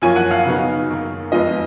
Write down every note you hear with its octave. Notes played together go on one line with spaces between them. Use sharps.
F#2 F3 A#3 C#4 G#5
F#5
F5
C#3 F#3 B3 D#4
F#2 D#3 A#3
F2 F3 G#3 B3 F4 D#5